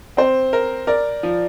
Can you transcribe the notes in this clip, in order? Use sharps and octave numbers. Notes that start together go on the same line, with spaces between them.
C4 C5
A#4
A#4 D5
F3